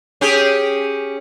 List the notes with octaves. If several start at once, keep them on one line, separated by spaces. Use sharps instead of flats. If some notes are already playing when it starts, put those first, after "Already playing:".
C#4 G4 G#4